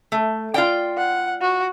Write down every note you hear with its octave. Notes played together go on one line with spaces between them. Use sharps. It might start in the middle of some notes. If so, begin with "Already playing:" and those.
A3
F4 D5 G5
F#5
F#4